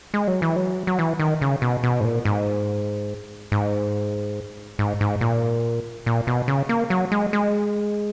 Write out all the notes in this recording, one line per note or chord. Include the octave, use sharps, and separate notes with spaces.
G#3
F#3
E3
F#3
F#3
E3
D#3
C#3
B2
B2
G#2
A#2
G#2
G#2
G#2
G#2
A#2
A#2
B2
C#3
A#3
F#3
G#3
G#3